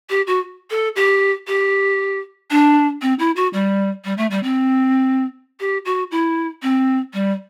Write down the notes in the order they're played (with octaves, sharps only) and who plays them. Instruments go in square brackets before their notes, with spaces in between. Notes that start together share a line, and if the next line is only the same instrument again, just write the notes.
[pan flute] G4
F#4
A4
G4
G4
D4
C4
E4
F#4
G3
G3
A3
G3
C4
G4
F#4
E4
C4
G3